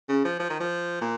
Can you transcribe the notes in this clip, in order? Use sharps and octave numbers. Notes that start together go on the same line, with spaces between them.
C#3
F3
F3
D#3
F3
A#2